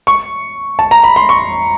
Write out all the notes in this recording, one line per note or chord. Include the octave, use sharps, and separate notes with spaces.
C#6
A5
A#5
B5
C6
C#6